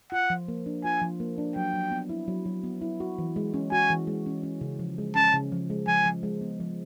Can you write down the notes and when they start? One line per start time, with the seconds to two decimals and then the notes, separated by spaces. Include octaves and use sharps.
0.12 F4 F#5
0.30 F3
0.48 A#3
0.66 D4
0.84 F4 G#5
1.01 F3
1.20 A#3
1.38 D4
1.56 F#3 G5
1.73 F#3
1.91 B3
2.09 E4
2.28 F#3
2.46 F#3
2.64 B3
2.81 E4
3.00 F#4
3.18 E3
3.36 G#3
3.54 C#4
3.71 F#4 G#5
3.90 E3
4.07 G#3
4.26 C#4
4.43 C#4
4.61 C#3
4.79 F3
4.98 G#3
5.15 C#4 A5
5.33 C#3
5.52 F3
5.70 G#3
5.87 F3 G#5
6.06 F3
6.23 G#3
6.41 B3
6.60 F3